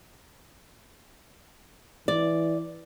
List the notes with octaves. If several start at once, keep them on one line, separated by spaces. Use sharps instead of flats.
E3 D5